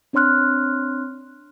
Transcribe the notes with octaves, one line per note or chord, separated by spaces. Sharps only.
C4 D4 C#5 C6 F6 F#6